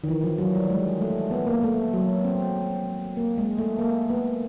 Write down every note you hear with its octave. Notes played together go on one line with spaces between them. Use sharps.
D#3
E3
F3
F#3
G3
G#3
A3
B3
A#3
A3
F#3
C4
A#3
G#3
A3
A#3
B3